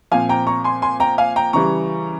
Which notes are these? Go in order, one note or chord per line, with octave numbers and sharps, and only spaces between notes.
A#2 F3 C4 F5 G#5
G5 A#5
A#5 C#6
G#5 C6
G#5 C6
G5 A#5
F5 G#5
G5 A#5
C#3 E3 G3 A#5 C#6